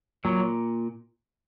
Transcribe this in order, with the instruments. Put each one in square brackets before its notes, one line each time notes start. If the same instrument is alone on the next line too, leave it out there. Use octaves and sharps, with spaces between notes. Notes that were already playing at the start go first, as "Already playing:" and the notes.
[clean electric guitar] A#2 [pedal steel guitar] F#3